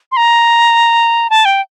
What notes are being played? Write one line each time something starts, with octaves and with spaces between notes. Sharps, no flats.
C6
A#5
A5
G5